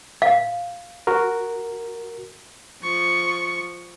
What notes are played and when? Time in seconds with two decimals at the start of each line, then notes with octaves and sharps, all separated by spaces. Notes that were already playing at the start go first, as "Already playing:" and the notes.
0.22 F5
1.07 F#4 A#4
2.82 F3 C#6